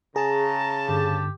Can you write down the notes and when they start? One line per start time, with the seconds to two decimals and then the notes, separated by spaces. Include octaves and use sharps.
0.16 C#3 G#4 A5 A#5
0.89 G2 D3 G4